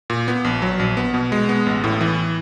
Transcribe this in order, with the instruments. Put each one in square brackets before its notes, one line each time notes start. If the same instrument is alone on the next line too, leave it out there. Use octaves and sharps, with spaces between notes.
[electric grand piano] A#2
B3
A#1
F#3
A#1
B3
B2
G#3
B3
A1
A2
E3